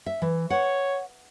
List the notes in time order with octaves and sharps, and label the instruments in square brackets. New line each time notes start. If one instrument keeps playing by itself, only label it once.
[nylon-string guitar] E5
E3
[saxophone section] C#5 [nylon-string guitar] F#5